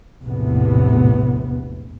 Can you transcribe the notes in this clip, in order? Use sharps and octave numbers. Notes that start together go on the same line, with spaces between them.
F1 A#1 E2 A2 C3 B3